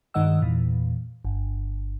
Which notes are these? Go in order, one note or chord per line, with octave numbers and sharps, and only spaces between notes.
G2 D#3 G#3 D#5 F#5 E6
E2 A#2 E3
G1